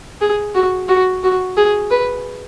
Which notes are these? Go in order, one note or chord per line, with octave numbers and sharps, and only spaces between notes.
G#4
F#4
F#4
F#4
G#4
B4